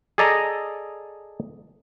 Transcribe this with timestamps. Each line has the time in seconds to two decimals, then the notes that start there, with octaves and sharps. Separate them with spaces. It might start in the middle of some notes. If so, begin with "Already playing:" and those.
0.18 G#4 A4 D5 D#5 A#5